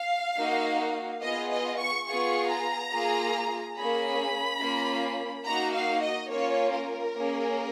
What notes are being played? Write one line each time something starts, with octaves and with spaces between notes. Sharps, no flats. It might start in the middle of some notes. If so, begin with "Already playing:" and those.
Already playing: F5
A#3 D#4 F#4
B3 F4 G#4 D#5
D#5
C#6
B3 F4 G#4 C#6
A#5
A#3 F4 G#4
A#3 C#4 G#4 B5
A#3 C#4 F4
A#3 D#4 F#4 A#5
F5
D#5
A#3 C#4 F4 C#5
A#4
A#3 C#4 G#4